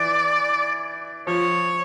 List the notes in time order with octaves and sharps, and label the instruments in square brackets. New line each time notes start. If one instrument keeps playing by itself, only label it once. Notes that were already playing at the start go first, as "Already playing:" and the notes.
Already playing: [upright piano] E3 [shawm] D5
[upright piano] F3 [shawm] C#5